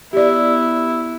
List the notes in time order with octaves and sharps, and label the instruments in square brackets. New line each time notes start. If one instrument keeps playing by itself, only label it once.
[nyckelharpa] B3 E4 [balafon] G4 D5